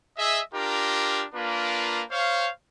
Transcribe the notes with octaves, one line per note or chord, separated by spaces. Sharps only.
G#4 D#5 E5
D4 F4 G4 A#4
A#3 D4 F4 A#4 B4
C5 C#5 F5